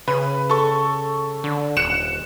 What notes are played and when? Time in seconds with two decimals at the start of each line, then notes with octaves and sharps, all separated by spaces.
0.08 C#3 B4
0.50 A4 C#6
1.44 D3
1.77 D#1 F#6 C#7 E7